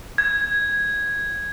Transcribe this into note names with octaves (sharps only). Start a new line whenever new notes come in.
G#6